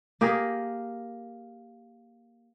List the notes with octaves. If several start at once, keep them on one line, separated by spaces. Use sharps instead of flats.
A#3 G4 G#4 A#4